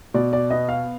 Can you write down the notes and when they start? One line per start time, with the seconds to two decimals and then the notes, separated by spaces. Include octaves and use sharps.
0.14 B2 D5
0.33 D5
0.50 B3 D#5
0.69 F5